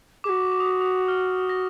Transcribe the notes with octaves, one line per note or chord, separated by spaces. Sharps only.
F#4 G#4 D6
D6
D#6
D6
D#6
F6
A#6